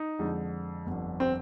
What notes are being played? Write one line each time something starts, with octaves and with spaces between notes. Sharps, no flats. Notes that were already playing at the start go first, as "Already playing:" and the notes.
Already playing: D#4
F2 D3 G#3
G1 F2 D3
C4